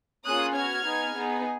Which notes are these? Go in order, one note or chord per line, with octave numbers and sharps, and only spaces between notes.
A#3 C#4 F4 G#4 D#6 F#6
B3 F#4 F6 G#6
B3 D#4 G#4
B3 D#4 G#4